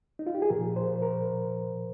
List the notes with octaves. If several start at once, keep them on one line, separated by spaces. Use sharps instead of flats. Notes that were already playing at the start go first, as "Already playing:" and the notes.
D#4
F4
G4
G#4
A#2 F3 A#4
C5
A#4